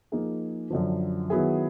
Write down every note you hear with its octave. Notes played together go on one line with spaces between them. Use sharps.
F3 A#3 D#4 G#4
F#2 D3 F3
D#3 F#3 B3 E4 G#4